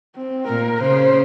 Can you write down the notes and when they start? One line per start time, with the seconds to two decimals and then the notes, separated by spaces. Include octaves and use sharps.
0.16 C4
0.48 A#2 A#4
0.80 C#3 C5